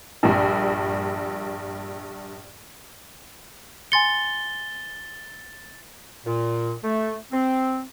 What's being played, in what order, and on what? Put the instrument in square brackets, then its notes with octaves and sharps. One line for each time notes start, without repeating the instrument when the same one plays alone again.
[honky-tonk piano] A#1 G2
[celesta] G#5 C6 C#7 [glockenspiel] A6 G7
[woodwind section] A#2
A3
C4